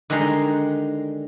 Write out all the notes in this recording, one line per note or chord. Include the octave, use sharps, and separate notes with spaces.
D3 D#3 G3 G#3 A#5 C6